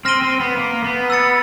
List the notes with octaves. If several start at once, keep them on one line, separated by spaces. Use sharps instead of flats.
C4 F6 A#6 D#7 G7
C4
B3
A#3
B3
E6 A6 C#7